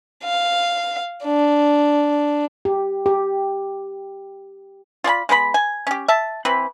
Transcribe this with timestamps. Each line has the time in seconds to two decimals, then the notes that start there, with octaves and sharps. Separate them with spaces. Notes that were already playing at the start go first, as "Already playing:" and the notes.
0.24 F5
1.24 D4
2.65 G4
3.06 G4
5.04 F4 D5 G#5 B5
5.29 G#3 B3 C5 B5
5.54 G#5
5.87 C#4 G4
6.08 E5 A5
6.45 E3 C4 B4 B5